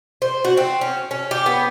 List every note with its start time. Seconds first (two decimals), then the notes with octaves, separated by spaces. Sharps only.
0.22 C5
0.44 F#4
0.57 C4
0.81 C#4
1.11 C#4
1.31 G4
1.46 B3